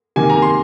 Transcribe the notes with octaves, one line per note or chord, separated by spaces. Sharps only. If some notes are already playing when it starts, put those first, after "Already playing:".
C3 D#3 A#3 G#5
A#5
C6